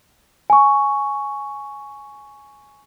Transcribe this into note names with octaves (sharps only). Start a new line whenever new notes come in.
G#5 C#6